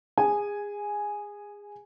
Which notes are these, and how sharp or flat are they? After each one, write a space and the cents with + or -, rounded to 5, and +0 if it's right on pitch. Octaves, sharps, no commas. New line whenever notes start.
G#4 -25 G#5 +0